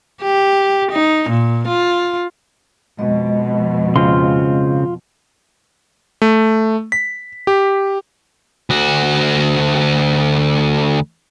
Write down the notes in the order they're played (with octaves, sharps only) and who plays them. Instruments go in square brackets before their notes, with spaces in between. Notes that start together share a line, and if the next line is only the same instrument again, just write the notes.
[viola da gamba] G4
D#4
A#2
F4
[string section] F2 B2 [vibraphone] G#3 D#5
[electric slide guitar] C#3 C4 [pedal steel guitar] F4 C6
[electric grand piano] A3
B6
G4
[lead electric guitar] D2 F#4